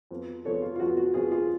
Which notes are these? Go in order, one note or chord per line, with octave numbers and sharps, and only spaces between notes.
F2 F3 B3
F2 F3 B3 A4 C#5
F4
F4
F2 F3 B3 F#4
F#4
F2 F3 B3 F4 G#4
F4 G#4